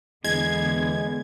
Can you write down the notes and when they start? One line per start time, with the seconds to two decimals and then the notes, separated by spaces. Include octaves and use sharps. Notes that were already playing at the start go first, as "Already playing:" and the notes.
0.24 E2 D3 G#3 B3 G#6